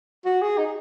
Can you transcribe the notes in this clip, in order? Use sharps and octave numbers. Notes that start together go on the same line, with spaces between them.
F#4
G#4
D#4